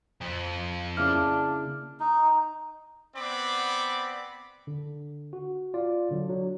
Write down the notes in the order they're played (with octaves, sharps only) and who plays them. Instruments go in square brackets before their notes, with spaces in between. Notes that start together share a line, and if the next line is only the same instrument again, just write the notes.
[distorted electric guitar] F2
[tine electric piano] C#3 A#3 E4 [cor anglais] D4 [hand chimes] F6
[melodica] D#4
[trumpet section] B3 C4 D5 B5 D6
[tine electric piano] D3
F#4
F4 D5
D3 F#3
F#3